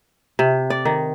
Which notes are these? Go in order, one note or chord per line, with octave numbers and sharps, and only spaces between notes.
C3
D5
D#3